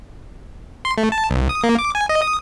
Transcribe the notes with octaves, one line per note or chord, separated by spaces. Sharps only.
C6
A3
A5
C2
D#6
A#3
D6
G#5
D#5
D#6